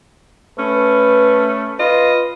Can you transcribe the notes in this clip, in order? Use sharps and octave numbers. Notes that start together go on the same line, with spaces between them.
A3 C#4 B4
F4 B4 D#5